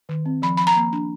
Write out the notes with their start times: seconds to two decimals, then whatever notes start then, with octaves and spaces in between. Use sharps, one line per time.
0.09 D#3
0.26 C4
0.42 F3 B5
0.57 F3 B5
0.67 A#5
0.76 A#3
0.92 D4